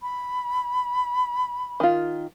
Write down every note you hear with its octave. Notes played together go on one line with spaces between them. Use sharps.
B5
D#3 F4